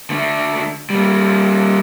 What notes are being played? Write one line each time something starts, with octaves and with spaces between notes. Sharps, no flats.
D3 A3
G3 A#3